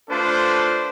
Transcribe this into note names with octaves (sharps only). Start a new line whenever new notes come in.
A3 D4 F4 A4 B4 C5